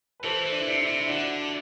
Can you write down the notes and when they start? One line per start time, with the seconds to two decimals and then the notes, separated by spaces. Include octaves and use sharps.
0.20 B4
0.24 E3 A4 C5
0.45 E3
0.52 D4
0.60 E4
0.66 C3 D4
0.80 E4
0.87 C3
1.00 E4
1.08 D3 D4 F#4